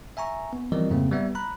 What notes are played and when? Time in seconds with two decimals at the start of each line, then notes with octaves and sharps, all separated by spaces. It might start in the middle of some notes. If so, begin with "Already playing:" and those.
0.17 E5 G#5 A#5 C#6
0.53 B3
0.72 E3 F3 G3 C4 A#4 D#5
0.90 F2 G#2 C#3 A3 A#3 C4
1.12 G3 B3 E5
1.35 A#5 B5 F#6